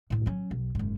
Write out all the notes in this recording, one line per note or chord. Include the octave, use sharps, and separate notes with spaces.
D2 A2
F#3 C#4
B1
F#1 G#2